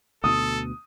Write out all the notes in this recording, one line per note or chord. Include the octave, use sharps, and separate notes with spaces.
D2 B2 A4 D#6